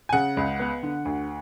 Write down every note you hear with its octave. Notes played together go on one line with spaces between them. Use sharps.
G#5
C#3 F#5
C#2
B3
D3
D2